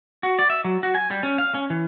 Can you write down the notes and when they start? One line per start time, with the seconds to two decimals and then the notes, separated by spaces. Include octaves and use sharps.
0.23 F#4
0.39 D5
0.50 E5
0.64 F#3
0.83 F#4
0.95 G#5
1.11 G3
1.23 C#4
1.38 F5
1.54 C#4
1.70 E3